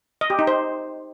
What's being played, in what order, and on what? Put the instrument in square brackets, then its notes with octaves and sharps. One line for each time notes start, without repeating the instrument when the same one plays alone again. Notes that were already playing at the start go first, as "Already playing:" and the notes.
[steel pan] D#5
G4
D#4
C5